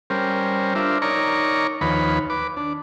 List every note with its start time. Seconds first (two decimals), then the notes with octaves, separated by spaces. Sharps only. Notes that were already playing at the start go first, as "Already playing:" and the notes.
0.10 G3 C#4 A#4 C5
0.75 D4 F4 A#4 C5 E5
1.02 D#4 A#4 C#5 D5 A#5 C#6
1.81 D#2 D#3 F3 B4 C#5 B5
2.30 B4 D6
2.57 D4